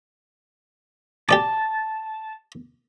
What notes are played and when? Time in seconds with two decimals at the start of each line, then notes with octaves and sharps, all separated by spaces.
1.29 G4 D5 A5 D6